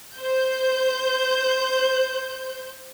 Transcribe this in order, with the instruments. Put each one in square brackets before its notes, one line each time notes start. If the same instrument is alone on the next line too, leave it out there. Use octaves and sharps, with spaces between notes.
[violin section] C5 G6